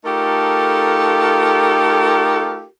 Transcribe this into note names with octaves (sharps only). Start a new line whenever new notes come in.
A3 D#4 F4 G4 A4 A#4